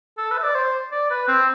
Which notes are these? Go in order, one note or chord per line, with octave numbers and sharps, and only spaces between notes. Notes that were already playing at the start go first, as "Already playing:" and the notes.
A4
B4
E5
D5
C5
D5
B4
C4